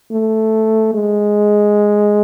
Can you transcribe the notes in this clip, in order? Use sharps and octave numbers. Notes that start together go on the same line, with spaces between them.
A3
G#3